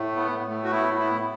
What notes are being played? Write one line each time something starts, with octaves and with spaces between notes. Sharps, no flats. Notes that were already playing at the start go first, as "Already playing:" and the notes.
Already playing: A2 A3
B3
A2 A3
F#4
B3 E4
B3 E4